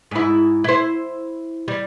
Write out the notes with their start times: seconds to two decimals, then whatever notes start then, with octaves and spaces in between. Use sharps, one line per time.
0.11 G#2 E4
0.64 E4 C5
1.68 G3